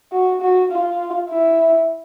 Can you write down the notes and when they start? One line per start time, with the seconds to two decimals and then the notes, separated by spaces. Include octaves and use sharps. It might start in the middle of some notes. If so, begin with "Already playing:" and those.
0.12 F#4
0.41 F#4
0.71 F4
1.30 E4